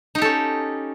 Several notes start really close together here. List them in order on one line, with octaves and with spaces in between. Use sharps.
D#4 G4 A4 C#4